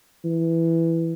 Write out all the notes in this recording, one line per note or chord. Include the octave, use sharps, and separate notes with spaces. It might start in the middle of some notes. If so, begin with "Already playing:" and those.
E3